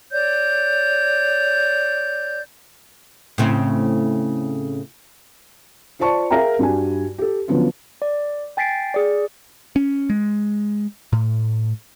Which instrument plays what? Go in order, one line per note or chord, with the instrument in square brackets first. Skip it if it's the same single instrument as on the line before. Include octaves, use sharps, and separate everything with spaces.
[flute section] C#5 D5 G6
[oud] A2 C#3 C4
[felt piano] F4 C5 D5 A5 C#6
G#4 A#4 E5 F5 G5 A#5
G2 G3 F#4 G#5
G4 A4
D3 F3 F#3 B3 C#4 F4
[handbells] D5
G5 G#5 A6 B6 C7 D7
G#4 D5
[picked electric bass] C#4
G#3
A2